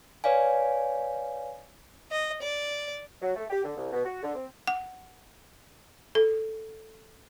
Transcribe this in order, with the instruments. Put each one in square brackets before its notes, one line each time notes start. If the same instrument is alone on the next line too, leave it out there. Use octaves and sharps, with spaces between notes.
[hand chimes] B4 C#5 D5 F5 G#5
[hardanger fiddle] D#5
D5
[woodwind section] F#3
A3
G4
D3
C2
B2
F#4
D3
C4
[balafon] F#5
A4